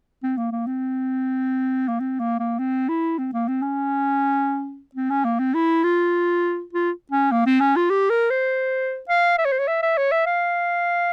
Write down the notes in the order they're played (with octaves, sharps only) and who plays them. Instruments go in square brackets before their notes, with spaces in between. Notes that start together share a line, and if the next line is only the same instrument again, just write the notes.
[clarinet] C4
A#3
A#3
C4
A#3
C4
A#3
A#3
C4
E4
C4
A#3
C4
C#4
C4
C#4
A#3
C4
E4
F4
F4
C#4
A#3
C4
C#4
F4
G4
A#4
C5
F5
E5
C#5
C5
C#5
E5
E5
C#5
E5
F5